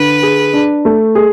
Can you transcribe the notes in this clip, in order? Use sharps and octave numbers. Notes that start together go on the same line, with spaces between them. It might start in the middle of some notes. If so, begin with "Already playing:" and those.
Already playing: D3 B4
G#4
D4
A3
G#4